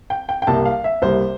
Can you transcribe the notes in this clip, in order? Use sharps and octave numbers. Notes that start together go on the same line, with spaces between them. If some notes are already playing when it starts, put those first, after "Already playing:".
G5
G5
G5
C2 C3 G3 A#3 A5
F5
E5
C2 C3 G3 A#3 C5